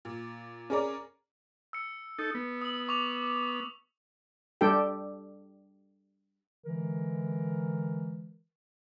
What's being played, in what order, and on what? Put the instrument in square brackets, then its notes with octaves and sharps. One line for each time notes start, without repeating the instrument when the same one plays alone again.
[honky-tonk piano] A#2
C#4 G#4 A#4 C#5 D5 A#5
[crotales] E6 C#7
[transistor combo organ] D#4 A4
B3
[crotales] D#6 F#7
C#6 D6 F7
[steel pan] G3 D4 G4 A4 G5
[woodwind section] D3 E3 G#3 A#4